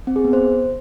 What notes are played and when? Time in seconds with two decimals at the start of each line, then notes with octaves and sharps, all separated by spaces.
0.07 C4
0.16 G#4
0.24 B3
0.33 C5